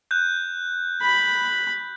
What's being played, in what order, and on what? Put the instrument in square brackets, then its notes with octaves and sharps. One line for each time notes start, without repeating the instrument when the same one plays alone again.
[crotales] F#6 G6
[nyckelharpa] B5